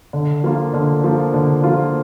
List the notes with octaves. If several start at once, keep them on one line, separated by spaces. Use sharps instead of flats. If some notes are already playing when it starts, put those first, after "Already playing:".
D3
F3 A#3 F4
D3
F3 A#3 F4
D3
F3 A#3 F4